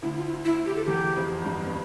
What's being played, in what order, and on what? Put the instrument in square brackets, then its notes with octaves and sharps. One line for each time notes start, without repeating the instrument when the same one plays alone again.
[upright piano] D2 D3 [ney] E4
[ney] F4
E4
E4
G4
A4
[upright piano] E2 E3 [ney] G4
[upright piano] F2 F3
G2 G3
B3